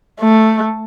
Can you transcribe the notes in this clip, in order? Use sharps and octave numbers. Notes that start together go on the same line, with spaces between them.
A3